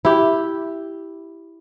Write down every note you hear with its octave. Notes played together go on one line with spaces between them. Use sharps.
E4 G4